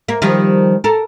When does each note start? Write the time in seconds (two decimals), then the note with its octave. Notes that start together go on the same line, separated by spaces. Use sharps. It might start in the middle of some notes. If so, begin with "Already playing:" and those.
0.08 A#3
0.22 D#3 F3 G3
0.84 A4 A#4